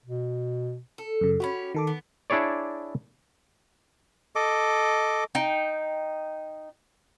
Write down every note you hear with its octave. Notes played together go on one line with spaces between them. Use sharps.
B2
A4
F#2 C#3
C#4 E4 F#4 G4 B5
D#3 A4 D6
B3
D4 E4 G#4 C#5 D5
A4 D#5 D6
D#4 G5